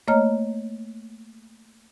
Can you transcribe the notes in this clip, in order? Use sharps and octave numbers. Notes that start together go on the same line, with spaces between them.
A3 A#3 C#5 D#5 A#5 F6